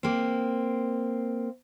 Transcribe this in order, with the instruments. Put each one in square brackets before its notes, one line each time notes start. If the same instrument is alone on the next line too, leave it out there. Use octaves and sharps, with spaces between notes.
[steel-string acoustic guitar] A#3 C4